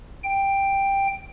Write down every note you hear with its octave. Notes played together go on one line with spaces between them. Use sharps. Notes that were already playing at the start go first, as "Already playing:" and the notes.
G5